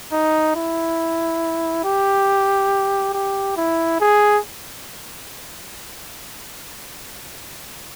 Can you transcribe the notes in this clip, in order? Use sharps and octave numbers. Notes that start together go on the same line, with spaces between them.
D#4
E4
G4
G4
E4
G#4